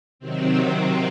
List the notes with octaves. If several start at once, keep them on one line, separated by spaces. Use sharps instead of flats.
C3 D#3 F#3 C4